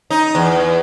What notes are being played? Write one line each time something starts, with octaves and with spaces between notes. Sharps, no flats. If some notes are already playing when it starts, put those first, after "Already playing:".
D#4
E2